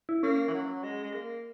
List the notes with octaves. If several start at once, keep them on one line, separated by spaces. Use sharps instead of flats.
E4
A#3 C#4
E3
F#3
G#3
G#3
A#3